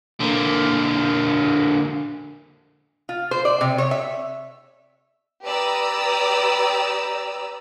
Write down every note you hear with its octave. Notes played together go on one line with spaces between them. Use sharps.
D3 A#3
F4
C5
D5
C3
C#5
E5
G4 B4 D5 A#5 D#6 E6